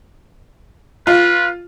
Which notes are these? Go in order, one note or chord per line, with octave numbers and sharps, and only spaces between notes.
F4 B4